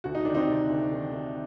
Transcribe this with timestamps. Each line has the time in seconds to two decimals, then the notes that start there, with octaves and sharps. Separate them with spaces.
0.04 D2 F#4
0.15 D#4
0.25 D#3 D4
0.35 C4 D#4
0.48 C3
0.69 D2
0.92 D#3
1.13 D#3